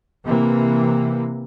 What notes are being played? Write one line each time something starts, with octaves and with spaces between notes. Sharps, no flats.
C3 E3 A#3